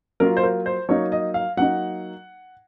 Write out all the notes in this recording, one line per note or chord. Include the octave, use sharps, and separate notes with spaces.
F#3 A#3 F4 A#4
C5
A#4
C5
F#3 A#3 D#4 C#5
D#5
F5
F#3 A#3 D#4 F#5